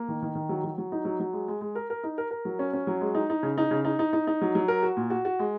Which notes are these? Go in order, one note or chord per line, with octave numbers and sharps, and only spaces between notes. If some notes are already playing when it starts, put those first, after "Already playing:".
Already playing: A#3
D#3
D#3
D#3
F#3
F#3
F#3
D#4
F#3
F#3
G#3
G#3
G#3
A#4
A#4
D#4
A#4
A#4
F#3
C#4
C#4
F#3
G#3
D#4
D#4
C#3
D#4
C#3
D#4
D#4
D#4
D#4
F#3
F#3
A#4
F#4
A#2
F#4
F#4
G#3